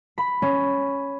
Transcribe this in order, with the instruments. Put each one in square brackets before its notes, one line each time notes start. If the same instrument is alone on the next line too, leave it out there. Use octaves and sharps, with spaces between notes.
[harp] B5
C#4